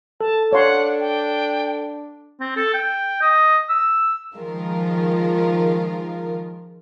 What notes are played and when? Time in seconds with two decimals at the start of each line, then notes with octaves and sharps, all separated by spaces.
0.21 A4 A5
0.53 D4 C#5 F5 F#5 C6
1.00 G5
2.40 C4
2.56 A4
2.74 G5
3.22 D#5
3.69 E6
4.35 D#3 F3 G#3 F4 A#4